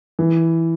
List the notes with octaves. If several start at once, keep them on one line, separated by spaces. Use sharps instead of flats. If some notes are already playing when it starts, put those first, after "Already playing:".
E3